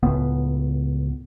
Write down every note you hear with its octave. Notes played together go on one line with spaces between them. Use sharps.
C#2 A2 B3